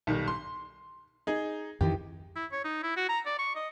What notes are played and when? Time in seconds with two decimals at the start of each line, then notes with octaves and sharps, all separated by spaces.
0.07 B1 D#3 G3
0.28 C6
1.27 D#4 G#4
1.81 F2 D#3 E3 G4
2.36 E4
2.52 C#5
2.64 D#4
2.83 E4
2.97 F#4
3.09 A#5
3.26 D5
3.39 C#6
3.55 D#5